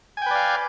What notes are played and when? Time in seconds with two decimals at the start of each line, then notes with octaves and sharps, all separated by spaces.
0.17 G#5
0.22 G5
0.26 B4
0.31 D5
0.35 F5